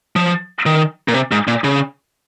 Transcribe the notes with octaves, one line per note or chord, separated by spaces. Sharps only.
F3
D#3
A#2
C3
G#2
A#2
C#3